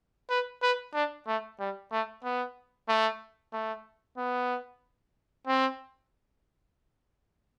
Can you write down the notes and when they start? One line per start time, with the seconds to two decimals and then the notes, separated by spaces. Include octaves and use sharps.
0.30 B4
0.62 B4
0.94 D4
1.27 A3
1.60 G3
1.92 A3
2.24 B3
2.89 A3
3.53 A3
4.18 B3
5.47 C4